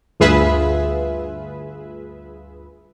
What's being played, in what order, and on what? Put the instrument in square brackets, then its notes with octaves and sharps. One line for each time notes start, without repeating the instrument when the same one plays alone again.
[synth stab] D2 G2 F4 G#4 B4 E5